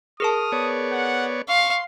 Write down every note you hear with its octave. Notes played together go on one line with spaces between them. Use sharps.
G#4 A#4 A5 D#6 F6
B3 C#5 D5
F#5
F5 C6 C#6